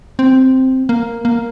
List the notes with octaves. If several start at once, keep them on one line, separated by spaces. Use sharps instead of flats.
C4
A#3
A#3